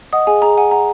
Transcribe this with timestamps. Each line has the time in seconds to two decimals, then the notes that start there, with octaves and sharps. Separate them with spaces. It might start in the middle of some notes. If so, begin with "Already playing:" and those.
0.13 D#5 F#5 D#6
0.27 G#4 G#5
0.42 G#4 A#5
0.57 F#5 G#5
0.71 F#5 A#5